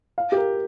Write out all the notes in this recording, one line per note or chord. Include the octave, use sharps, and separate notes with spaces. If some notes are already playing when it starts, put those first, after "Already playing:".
F5
G4
A#4